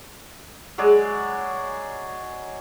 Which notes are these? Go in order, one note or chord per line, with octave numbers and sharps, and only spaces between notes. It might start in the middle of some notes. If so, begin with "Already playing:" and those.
F#3 G#3 G#4 D5